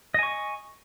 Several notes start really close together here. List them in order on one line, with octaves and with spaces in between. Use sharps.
D#5 G#5 C#6